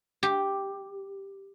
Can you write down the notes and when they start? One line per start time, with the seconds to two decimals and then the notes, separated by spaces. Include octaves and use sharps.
0.23 G4